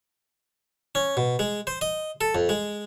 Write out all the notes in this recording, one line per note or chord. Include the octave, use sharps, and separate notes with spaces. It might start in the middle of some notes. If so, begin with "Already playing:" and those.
C#4
B2
G#3
C5
D#5
A4
F2
G#3